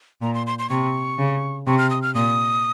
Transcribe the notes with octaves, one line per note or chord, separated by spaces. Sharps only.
A#2 A#5
C6
C6
C6
C3 C#6
C#3
C3 C#6
F6
D#6
F6
A#2 D#6